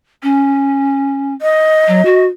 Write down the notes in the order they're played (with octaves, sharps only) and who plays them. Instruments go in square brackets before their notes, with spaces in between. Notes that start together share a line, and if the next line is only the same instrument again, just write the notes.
[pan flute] C#4
[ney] D#5
[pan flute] F#3
F#4